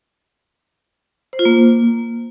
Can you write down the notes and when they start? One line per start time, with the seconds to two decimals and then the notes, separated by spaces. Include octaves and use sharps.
1.33 C5
1.39 F4
1.45 A#3